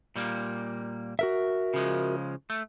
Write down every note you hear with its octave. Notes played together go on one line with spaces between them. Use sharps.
A#2 G3 A#3
F#4 A#4 E5
C#3 F3 G#3
A3